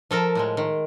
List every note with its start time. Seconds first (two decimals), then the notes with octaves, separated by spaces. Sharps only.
0.11 F3 A4 A#4 A5
0.35 A2 F3 G#3
0.57 D#3